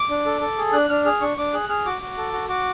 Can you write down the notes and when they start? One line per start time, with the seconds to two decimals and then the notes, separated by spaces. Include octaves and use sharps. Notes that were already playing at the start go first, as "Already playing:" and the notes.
Already playing: D6
0.10 D4
0.26 A4
0.41 A4
0.58 G#4
0.73 D4 F#6
0.89 D4 F6
1.05 G#4 F6
1.21 D4 C#6
1.37 D4 D6
1.53 G#4 F#6
1.69 G#4 F6
1.86 F#4 D6
2.02 F#4
2.18 A4
2.33 F#4
2.49 F#4 D6